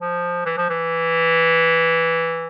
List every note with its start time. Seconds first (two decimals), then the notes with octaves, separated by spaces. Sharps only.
0.01 F3
0.46 E3
0.58 F3
0.69 E3